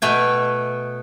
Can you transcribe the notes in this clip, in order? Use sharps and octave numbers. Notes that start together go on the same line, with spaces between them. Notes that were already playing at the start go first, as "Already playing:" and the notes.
B2 A3 G5 G#5